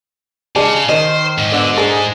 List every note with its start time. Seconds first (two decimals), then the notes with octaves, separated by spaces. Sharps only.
0.56 C#3 G#3 D4
0.89 D#3 C5 D#5
1.38 G#2
1.51 B2 D3
1.78 G#3 D4 G#4 A#4